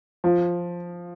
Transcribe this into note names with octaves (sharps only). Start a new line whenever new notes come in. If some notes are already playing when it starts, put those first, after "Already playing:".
F3